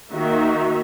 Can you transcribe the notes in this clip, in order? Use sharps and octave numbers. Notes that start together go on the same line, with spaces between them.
D#3 A#3 D#4 F#4 E5